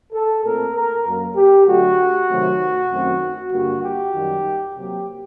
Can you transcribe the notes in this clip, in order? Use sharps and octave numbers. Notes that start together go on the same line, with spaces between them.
A4
A#2 A3 C4 A#4
A#4
F#2 F#3 A#3
G4
D3 F#3 A3 F#4
C3 D#3 F#3 A3 C4
F#2 D#3 A3 C4
G2 D3 G3 A#3 F#4
G4
F#2 D#3 G3
C3 F#3 A#3 G4